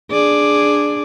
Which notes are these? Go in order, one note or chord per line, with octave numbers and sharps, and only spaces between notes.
D4 G#4 D5